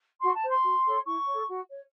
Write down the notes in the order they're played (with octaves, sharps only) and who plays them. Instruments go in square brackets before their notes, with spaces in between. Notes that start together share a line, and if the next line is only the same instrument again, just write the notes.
[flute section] F#4 C6
A5
C5
C6
F#4
A4 C#5
E4 C#6
A4 C#5
F#4
C#5